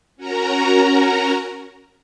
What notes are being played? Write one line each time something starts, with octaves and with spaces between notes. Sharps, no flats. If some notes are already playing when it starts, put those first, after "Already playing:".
C#4 F#4 A#4 A#5